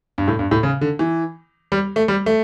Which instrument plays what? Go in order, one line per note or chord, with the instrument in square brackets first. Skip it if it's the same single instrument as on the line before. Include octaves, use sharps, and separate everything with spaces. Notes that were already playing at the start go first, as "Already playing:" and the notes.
[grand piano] G2
A2
G2
A2
C#3
D3
E3
G3
A3
G3
A3